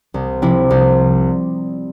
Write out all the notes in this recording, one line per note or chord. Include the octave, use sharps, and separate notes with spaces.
C2
C3 F3 C4 E4
C2